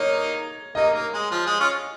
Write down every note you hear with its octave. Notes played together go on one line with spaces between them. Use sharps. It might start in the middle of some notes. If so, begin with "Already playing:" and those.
Already playing: A#3 D#4 C#5
A#3 D#4 D#5
A#3
G#3
F3
G#3
C#4 F4